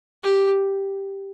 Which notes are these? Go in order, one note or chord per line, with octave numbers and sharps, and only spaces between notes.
G4